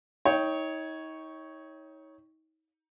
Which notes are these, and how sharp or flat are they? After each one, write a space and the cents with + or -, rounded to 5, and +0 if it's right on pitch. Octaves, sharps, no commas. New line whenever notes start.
D#4 +35 C#5 +0 G5 +0